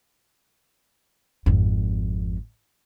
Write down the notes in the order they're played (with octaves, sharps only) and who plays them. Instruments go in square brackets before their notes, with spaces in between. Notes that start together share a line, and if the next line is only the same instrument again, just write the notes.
[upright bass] G#1 F2